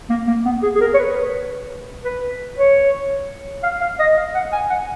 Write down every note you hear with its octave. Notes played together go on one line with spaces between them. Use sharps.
A#3
A#3
B3
G#4
G#4
A#4
C#5
B4
B4
C#5
F5
F5
D#5
F5
F#5
G#5
F#5